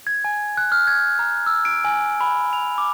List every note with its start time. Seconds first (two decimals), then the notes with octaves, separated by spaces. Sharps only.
0.07 G#6
0.24 G#5
0.57 F#6
0.72 F6
0.87 G#6
1.19 A#5
1.46 E6
1.65 D7
1.85 G#5
2.21 B5
2.53 F7
2.78 D6